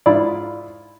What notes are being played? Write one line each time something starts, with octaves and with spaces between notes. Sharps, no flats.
G#2 E4 F4 D5